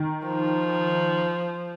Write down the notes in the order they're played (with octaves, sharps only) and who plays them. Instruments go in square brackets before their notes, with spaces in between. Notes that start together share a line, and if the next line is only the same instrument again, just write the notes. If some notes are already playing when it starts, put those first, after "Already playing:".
Already playing: [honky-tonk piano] D#3
[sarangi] F3